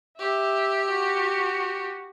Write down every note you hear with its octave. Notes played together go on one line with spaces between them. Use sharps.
G4 E5
F#4